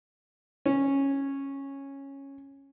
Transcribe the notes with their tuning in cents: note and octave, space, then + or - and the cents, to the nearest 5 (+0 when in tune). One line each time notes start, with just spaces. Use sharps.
C#4 -10